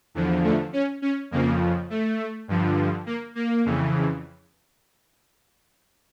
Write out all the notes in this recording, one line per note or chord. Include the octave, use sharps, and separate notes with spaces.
E2 D3 F3
A3
C#4
C#4
F2 C#3 F3 A#3
A3
G2 D3 F3
A#3
A#3
F2 C#3 E3